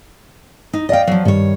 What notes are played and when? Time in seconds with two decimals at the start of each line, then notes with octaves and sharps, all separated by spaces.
0.73 D#4
0.89 D5 D#5 F5 G5
1.07 F3 F#3
1.25 G2 D#3 C#5